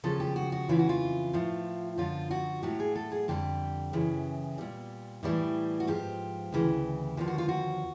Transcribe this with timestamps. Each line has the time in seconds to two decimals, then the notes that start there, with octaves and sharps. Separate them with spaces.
0.04 D#2 C#3 F3 A4
0.20 G4
0.36 F#4
0.52 F#4
0.68 F2 C#3 E3 F4
0.79 F#4
0.89 F4
1.33 A2 F3
1.98 F#2 D3 F3 F4
2.31 F#4
2.63 A2 F#3 G4
2.80 G#4
2.95 A4
3.12 G#4
3.28 F2 D3 G3 G4
3.93 F#2 C#3 E3
4.58 A#2 G3
5.23 A2 E3 G3
5.80 F#4
5.87 G#2 F3 G4
6.52 D2 C#3 E3
7.17 D#2 D3 F3 G4
7.28 F#4
7.38 F4
7.49 F#4